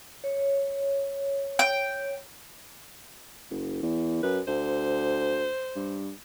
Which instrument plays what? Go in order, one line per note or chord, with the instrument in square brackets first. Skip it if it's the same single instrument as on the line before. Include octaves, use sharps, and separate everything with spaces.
[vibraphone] C#5
[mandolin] G5
[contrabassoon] F#1
E2
[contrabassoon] F#2 [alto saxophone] B4
[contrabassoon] D2 [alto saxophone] C5
[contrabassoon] G2